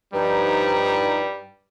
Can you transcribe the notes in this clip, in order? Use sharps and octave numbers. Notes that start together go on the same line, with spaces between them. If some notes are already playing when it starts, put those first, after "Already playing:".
G2 F3 G3 D#4